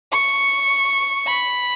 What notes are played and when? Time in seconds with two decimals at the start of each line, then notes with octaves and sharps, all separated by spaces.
0.12 C#6
1.27 B5